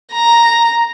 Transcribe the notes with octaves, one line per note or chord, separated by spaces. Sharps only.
A#5